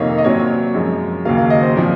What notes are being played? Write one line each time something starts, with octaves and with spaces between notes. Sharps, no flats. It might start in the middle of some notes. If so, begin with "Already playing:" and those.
Already playing: F2 C3 D#3 A#3 C#5 D#5 F5
D#5
A#2 F#3 C4 C#5
F#2 F3 G#3
D#2 C#3 F#3 A#3 F5
F5
D#5
C5
A#2 F3 C4